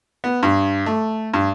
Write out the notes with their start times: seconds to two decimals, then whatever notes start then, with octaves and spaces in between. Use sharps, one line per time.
0.24 B3
0.43 G2
0.86 A3
1.34 G2